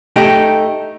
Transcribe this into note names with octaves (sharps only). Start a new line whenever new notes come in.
A3 D#4 G4